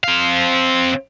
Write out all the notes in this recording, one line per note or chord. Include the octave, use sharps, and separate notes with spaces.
C4 F5